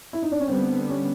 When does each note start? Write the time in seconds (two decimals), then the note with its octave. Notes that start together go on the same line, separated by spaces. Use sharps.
0.13 E4
0.22 D#4
0.32 D4
0.40 C#4
0.48 D3 G3 B3 C4
0.89 C#4